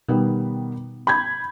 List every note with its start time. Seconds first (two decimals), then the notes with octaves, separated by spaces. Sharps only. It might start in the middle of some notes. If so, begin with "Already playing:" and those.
0.08 B2 D#3 G3 B3
1.07 B5 G6 G#6